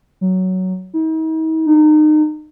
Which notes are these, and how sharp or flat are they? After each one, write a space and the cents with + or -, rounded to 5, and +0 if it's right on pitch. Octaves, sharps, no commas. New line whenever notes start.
F#3 +10
D#4 +45
D#4 -30